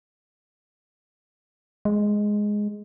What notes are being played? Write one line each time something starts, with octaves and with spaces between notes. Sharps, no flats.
G#3